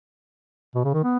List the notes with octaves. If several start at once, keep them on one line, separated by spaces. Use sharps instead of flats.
B2
C#3
D#3
B3